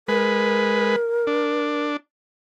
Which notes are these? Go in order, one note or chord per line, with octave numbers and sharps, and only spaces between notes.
G#3 A#4 B4
D4